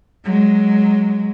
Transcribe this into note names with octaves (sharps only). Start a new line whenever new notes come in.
F#3 G#3